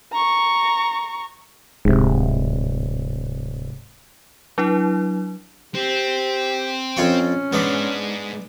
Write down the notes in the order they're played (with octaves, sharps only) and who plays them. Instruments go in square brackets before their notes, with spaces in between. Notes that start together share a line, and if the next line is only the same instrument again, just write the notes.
[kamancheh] A#5 C#6
[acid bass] D1 [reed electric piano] G#2 C3
[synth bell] F#3 D4 E4
[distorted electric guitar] C4 [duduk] G4
[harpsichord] F2 F4 C#6 [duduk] C#4
[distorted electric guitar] G#2 [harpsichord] B3 D4